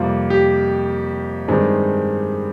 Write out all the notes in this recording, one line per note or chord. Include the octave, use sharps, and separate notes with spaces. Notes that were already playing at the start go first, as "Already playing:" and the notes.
Already playing: F2 C3 G3 A#3 F4
G4
G2 D#3 G#3 C4